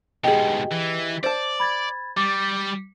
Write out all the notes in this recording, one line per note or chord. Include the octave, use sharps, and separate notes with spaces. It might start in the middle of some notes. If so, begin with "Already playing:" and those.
G#2 B2 G4 G#4 D#5
E3
C5 D5 A5
B5 G#6 A6
G3 D6 A6